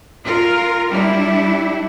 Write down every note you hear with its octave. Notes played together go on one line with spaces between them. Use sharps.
F4 A#4
G3 D4 E4